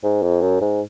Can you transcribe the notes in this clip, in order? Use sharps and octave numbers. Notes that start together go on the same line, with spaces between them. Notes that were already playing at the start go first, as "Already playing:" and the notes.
G#2
F2
F#2
G#2